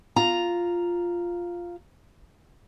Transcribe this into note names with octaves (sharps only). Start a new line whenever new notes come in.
F4 A#5